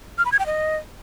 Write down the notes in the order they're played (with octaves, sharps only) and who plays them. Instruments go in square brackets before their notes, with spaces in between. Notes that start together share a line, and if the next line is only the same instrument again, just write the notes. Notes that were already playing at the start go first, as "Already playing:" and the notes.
[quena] F6
B5
G#6
G5
D#5